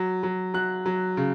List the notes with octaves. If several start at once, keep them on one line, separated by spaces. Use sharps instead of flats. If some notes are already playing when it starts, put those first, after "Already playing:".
Already playing: F#3
F#3
F#3 F#6
F#3
C#3